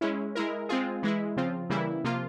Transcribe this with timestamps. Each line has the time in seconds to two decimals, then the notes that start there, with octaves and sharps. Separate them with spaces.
0.01 G#3 C#4 E4
0.35 G#3 E4 A#4
0.69 G#3 C4 F4 G#4
1.03 E3 G#3 E4
1.37 C#3 F3 C4 F4
1.69 C#3 E3 G3 A#3 E4
2.04 C3 F3 A#3 F4